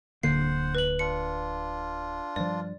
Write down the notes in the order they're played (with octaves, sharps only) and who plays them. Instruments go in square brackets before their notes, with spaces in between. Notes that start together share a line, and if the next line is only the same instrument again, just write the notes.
[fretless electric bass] D1 D3 A#3 [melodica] C5 F#5 [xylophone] C7
[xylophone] B4 F#7
[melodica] D4 F4 [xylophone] C#7
[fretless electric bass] G2 F3 [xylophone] D5